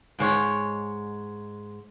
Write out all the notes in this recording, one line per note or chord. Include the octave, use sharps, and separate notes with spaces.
G#2 G#3 C#5